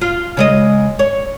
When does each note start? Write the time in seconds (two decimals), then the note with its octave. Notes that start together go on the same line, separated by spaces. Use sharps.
0.01 F4
0.37 C#3 G#3 D#5
0.99 C#5